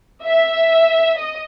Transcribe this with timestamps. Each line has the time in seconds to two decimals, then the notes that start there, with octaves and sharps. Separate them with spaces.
0.24 E5
1.17 D#5